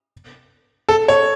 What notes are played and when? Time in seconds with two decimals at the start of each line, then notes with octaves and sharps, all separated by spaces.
0.89 A4
1.08 C#5